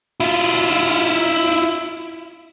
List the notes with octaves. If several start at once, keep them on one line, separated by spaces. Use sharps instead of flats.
E4 F4